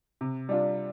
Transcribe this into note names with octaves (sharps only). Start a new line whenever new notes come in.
C3
G3 D4 F4